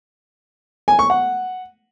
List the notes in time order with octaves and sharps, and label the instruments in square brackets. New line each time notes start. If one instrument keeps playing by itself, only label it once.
[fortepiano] G#5
C#6
F#5